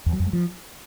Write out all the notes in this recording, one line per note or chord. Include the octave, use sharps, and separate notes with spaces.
E2
F#3
F2
G#3
F3